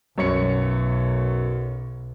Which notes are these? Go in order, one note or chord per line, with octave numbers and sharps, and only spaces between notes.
B1 F#2 C#5 C#7